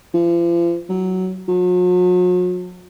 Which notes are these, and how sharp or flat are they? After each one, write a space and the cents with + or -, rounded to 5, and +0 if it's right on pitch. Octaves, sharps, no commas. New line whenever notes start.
F3 -40
F#3 +10
F#3 -45